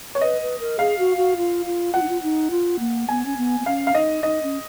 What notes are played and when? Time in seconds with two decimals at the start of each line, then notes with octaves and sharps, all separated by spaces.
0.15 C#5
0.21 B4 D#5
0.41 B4
0.60 A#4
0.79 G#4 F5
0.99 F#4
1.17 F#4
1.37 F4
1.66 F4
1.94 F4 F#5
2.02 D#4
2.09 F4
2.23 D#4
2.51 F4
2.79 A#3
3.09 B3 G#5
3.26 C#4
3.37 B3
3.60 B3
3.66 C#4 F5
3.87 F5
3.95 D#4 D#5
4.23 D#4 D#5
4.43 C#4